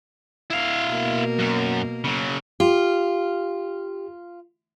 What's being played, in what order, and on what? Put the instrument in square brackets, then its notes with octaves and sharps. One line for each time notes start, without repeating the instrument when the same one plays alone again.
[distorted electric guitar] E4 F5
[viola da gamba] B2 A#3 A#4
[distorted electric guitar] F#2
C#3 F#3
[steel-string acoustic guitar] F4 [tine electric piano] G4